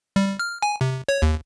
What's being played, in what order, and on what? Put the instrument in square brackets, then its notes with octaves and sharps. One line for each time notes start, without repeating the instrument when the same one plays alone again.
[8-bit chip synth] G3
F6
G#5
C3
C#5
D#2